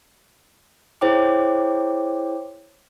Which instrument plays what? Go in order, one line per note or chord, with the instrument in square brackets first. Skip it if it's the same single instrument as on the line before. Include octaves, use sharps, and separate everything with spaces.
[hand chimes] E4 G#4 C5 C#5 G5 D6